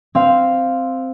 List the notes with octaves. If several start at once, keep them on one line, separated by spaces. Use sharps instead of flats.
C4 F5